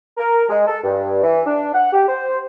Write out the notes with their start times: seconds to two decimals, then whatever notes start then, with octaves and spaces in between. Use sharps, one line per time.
0.17 A#4
0.48 G#3
0.66 A4
0.83 G2
1.21 E3
1.45 D4
1.73 F#5
1.92 G4
2.07 C5